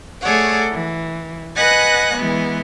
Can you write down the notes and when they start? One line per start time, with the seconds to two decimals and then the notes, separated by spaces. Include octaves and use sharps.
0.22 A3 G#4 A4 C#5 D5 F#5
0.71 E3
1.56 B4 D#5 F#5 G#5 F#6 A#6
2.16 E3 G#3 B3